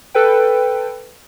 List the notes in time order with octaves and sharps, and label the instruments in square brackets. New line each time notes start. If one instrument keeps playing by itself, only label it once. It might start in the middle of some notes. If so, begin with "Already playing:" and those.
[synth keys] A4 B4 G5